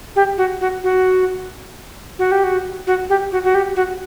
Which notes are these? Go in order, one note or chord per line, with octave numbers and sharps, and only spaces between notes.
G4
F#4
F#4
F#4
F#4
G4
F#4
F#4
G4
F#4
F#4
G4
F#4